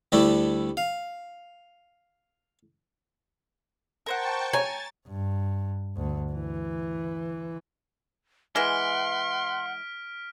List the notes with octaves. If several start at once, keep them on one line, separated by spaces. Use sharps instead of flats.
D2 G3 A3 D4 E4 A4
F5
A#4 C5 F#5 G5 A5 C#6
C#5 G#5 A#5 A6
G2
D2
E3
E3 G#3 F#5 C6 F6 B6 D7